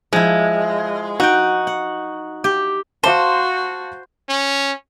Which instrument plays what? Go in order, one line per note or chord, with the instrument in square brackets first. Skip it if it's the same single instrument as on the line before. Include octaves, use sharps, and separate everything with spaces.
[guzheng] F3 E4 [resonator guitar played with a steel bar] G#3
[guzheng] D#4 G5 [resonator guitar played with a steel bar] F#4
[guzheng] F#5
G4
[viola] F#4 [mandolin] C5 [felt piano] F5 A5
[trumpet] C#4